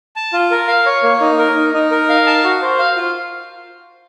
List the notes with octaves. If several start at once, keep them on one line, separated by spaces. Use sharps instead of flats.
A5
F4
A#4
F5
C#5
A#3
D#4
A#4
D#4
D#4
A#4
F5
A5
F#4
C5
F5
F4